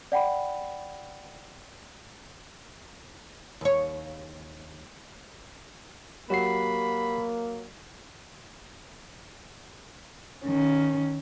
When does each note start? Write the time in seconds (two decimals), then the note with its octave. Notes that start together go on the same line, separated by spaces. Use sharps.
0.12 D5 F#5 G5 B5
3.61 D#2 C#5
6.30 F#3 A#3 F#4 G4 B5 C7
10.45 D#3 C#4